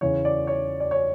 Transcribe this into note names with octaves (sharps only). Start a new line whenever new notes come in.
E2 C#3 E3 C#5
D5
C#5
D5
C#5